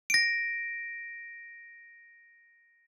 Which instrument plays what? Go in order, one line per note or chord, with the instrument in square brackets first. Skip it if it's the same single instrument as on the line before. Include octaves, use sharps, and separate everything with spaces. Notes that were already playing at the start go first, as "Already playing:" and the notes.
[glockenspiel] A#6 D7